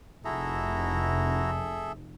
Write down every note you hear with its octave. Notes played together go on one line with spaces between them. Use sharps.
F1 E4 F#4 G#4 A4 E5 A#5